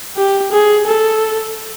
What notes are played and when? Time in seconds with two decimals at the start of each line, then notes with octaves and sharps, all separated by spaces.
0.17 G4
0.52 G#4
0.87 A4